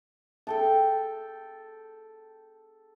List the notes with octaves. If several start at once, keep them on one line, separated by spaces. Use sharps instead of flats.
A4 G5 A5